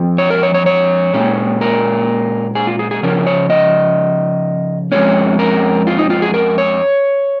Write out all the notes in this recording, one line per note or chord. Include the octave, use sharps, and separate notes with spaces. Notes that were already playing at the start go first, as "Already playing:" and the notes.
Already playing: F2 F3
C#5
A#4
C#5
C#5
C#5
A#2 G#3 C#4
A#4
G#4
F4
G#4
G#4
C#3 F3 C#4 A#4
C#5
D#5
F2 F3 G#3 C#4 C#5
A#4
F4
D#4
F4
G#4
A#4
C#5